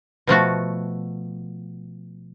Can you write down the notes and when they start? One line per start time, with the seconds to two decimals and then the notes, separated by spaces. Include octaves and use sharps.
0.27 B2 F3 A3 F#4